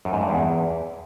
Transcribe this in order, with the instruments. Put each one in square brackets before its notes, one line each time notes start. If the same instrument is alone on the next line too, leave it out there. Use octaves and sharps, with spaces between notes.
[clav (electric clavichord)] F#2
G#2
G2
E2